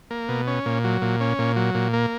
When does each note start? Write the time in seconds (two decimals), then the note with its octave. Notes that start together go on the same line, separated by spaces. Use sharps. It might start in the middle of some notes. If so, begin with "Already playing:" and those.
0.11 A#3
0.29 B2
0.47 C#4
0.66 A#2
0.84 F#3
1.02 A#2
1.20 C#4
1.39 A#2
1.56 F#3
1.75 A#2
1.93 A#3